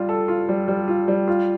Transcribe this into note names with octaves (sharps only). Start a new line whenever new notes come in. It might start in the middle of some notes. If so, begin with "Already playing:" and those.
Already playing: G3 F4
A4
F4
G3
G3
F4
G3
F4